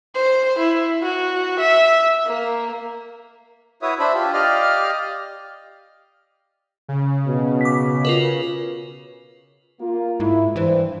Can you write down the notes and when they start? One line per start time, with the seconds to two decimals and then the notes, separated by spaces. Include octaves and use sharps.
0.15 C5
0.59 E4
1.02 F#4
1.60 E5
2.27 A#3
3.82 E4 F#4 B4 C#5 E5 D#6
3.99 D4 C5 E5 B5
4.14 F4 G4
4.33 G4 D5 D#5 F5 F6
6.89 C#3
7.27 B2
7.61 D6 B6
8.05 F4 A#4 B4
9.80 A#3 F4
10.20 G#2 E4
10.56 G2 E3 C5